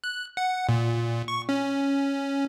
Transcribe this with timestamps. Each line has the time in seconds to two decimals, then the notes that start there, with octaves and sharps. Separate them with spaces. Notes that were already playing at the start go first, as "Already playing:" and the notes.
0.04 F#6
0.37 F#5
0.69 A#2
1.28 C#6
1.49 C#4